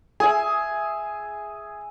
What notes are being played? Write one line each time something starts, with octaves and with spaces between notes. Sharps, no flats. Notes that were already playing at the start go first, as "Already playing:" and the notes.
G#4 E5 G#5